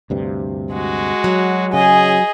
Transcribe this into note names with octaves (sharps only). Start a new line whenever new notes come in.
D2 G2 C3
G#3 F#4
F#3
C#3 G#4 D#5 G#5